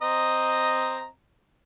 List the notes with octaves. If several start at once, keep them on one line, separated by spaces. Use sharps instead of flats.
C4 D#5 A#5